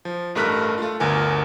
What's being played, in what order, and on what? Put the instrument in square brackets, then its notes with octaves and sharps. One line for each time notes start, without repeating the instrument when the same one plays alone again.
[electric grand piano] F3
A1 G2 A3 A#4 F#6 B6
A3 F4
G1 D2 A#4 G#5